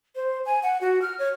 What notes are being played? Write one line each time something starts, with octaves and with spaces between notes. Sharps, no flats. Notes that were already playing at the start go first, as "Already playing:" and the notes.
C5
G#5
F#5
F#4
F6
C#5